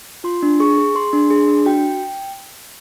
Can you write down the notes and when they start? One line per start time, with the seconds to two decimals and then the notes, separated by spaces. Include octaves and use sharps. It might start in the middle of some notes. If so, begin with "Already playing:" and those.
0.24 F4 C6
0.43 D4
0.60 G#4 C#6
0.78 G#4
0.95 G#4 C6
1.13 D4
1.30 G#4
1.48 D4
1.66 F#4 G5